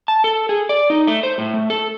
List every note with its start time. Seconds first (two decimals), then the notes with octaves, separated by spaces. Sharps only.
0.08 A5
0.24 A4
0.49 G#4
0.69 D5
0.90 D#4
1.07 A3
1.23 C5
1.38 A2
1.54 A3
1.70 A4